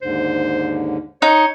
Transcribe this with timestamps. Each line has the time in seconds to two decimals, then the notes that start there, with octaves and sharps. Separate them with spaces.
0.02 D#2 G#2 D3 C5
1.22 D#4 C#5